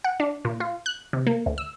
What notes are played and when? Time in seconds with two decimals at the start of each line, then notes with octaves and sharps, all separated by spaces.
0.04 F#5
0.20 D4
0.45 A#2
0.60 F4
0.86 F#6
1.13 C3
1.27 A#3
1.46 D2
1.58 E6